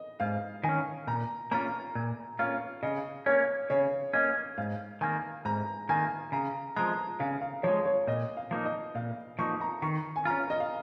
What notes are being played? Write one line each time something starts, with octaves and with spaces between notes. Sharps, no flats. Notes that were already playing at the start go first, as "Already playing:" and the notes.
Already playing: D#5
G#2 F5
D#3 G#5
C#4
A#2 A#5
A#3 C#4 F4 A#5
A#2
A#3 C#4 F4 F5
C#3 D#5
A#3 C#4 C#5
C#3 C#5
A#3 C#4 D#5
G#2 F5
D#3 A#3 G#5
G#2 A#5
D#3 A#3 G#5
C#3 A#5
F3 G#3 A#5
C#3 F5
F5
F3 G#3 C#5
C#5
A#2 D#5
F5
F3 A#3 D#4
D#5
A#2 F5
F3 A#3 D#4 C#6
A#5
D#3 C#6
G#5
C#4 F4 A#5
D#5
F5